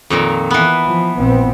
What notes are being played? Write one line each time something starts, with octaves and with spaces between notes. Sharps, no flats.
F2 A#2 D#3
E3 B3
F3
A#1 B3 C4